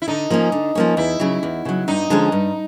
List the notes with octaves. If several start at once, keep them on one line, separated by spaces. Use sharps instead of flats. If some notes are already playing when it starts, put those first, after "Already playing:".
E4
D3 D#4
F3 A#3 C#4
D3
F3 A#3 C#4
E2 E4
C#3 F#3
E2
C#3 F#3
G2 D#4
D3 F3 G#3 C#4
G2